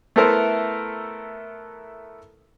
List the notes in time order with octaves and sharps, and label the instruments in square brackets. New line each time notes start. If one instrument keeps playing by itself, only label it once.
[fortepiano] A3 B3 E4 A4 A#4 C5